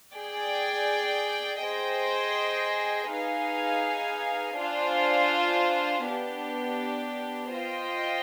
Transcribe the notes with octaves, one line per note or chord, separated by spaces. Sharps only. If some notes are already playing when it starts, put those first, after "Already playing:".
G#4 D5 G5
G#4 C5 D#5 G5
D#4 G#4 B4 F5 G#5
D4 F4 C5 F5 G#5
B3 D4 G4
F4 C5 D#5 G5